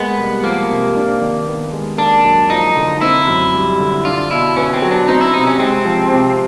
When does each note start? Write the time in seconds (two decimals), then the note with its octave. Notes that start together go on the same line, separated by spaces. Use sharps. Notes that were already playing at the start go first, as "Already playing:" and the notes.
Already playing: G#3 A#3 B3
0.18 C2
0.43 F3 A#3
0.69 C3
0.96 D4
1.21 D#3
1.47 B3
1.72 G#3
1.98 A#3 D4
2.24 F#2
2.50 F3 D#4
2.76 D3
3.01 C4 E4
3.27 F#2
3.54 G3
3.80 D3
4.05 D4 F4
4.31 B2 E4
4.56 B3 C#4
4.73 C4
4.82 F#3
4.91 D4
5.08 C4 D#4
5.21 E4
5.34 C3 D#4
5.47 C#4
5.59 G#3 C4
5.85 F3
6.11 C3